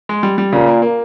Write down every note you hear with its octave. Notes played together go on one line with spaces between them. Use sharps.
G#3
G3
G3
A#2 C#3
A#3
A#3